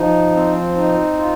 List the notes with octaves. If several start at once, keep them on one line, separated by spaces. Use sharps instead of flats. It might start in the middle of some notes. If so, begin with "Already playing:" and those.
Already playing: F3 D#4
C4
D#4
F4